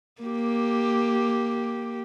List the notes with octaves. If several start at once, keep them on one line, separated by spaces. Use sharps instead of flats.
A#3 G4